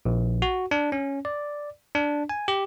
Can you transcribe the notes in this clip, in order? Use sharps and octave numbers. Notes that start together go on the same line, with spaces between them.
A#1
F#4
D4
C#4
D5
D4
G#5
G4